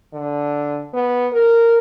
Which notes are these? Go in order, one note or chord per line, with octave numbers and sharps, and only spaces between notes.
D3
B3
A#4